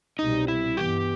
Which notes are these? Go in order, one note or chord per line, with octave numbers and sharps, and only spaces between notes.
C2 B2 G3 C4 D#4
E4
G2 E3 B3 G4